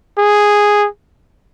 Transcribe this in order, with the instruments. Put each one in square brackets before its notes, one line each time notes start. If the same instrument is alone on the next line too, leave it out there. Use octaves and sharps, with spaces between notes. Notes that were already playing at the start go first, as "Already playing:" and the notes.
[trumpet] G#4